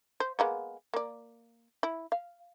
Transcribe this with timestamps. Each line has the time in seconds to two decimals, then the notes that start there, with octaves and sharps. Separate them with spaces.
0.20 C5
0.39 G#3 A#3 B3
0.94 A#3 D5
1.83 E4
2.12 F5